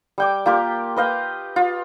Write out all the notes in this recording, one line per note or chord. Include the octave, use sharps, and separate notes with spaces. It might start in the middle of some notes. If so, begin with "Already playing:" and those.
G3 G5 D6
A#3 F4 G4 A#4
B4 D#5 F5 G5
F4